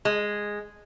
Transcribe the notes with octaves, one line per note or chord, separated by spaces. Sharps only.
G#3